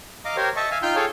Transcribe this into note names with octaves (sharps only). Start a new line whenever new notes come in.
D#5 F5 A#5 D6
G4 A#4 C5 C#5
D#5 E5 A5 C#6
E5 F5 G#5
D#4 F4 G5 C6 F6 G6
G#4 A4 C#5 F5 G5